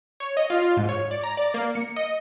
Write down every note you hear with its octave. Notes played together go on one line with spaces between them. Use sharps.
C#5
D#5
F4
F4
G#2
C#5
D5
A#5
D5
A#3
C#7
D#5